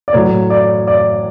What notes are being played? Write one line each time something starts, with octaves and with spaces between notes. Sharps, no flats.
D5
A2 F#3 C#5
D5
D5